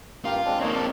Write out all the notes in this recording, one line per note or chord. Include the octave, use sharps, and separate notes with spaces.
G2 F4 G4 A#4
G#3 C4 D4
A#3 C4 D#4 C#5
D5 A5